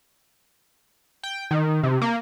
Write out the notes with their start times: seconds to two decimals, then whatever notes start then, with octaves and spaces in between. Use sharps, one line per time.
1.23 G5
1.51 D#3
1.83 C3
2.02 A#3